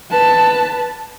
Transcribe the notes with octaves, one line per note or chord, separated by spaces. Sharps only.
B4 A5